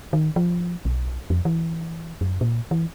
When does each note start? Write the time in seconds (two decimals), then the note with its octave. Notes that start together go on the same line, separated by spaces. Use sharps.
0.13 D#3
0.36 F3
0.85 B1
1.30 F2
1.45 E3
2.21 F#2
2.41 A#2
2.71 E3